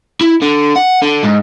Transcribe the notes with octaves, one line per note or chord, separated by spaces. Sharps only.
E4
D3
F#5
D3
G#2